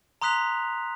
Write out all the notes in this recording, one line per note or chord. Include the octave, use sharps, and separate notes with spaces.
A#5 C6 D#6 F#6 B6 F7